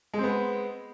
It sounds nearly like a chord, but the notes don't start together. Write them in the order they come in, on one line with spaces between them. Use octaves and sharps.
G#3 C4 B3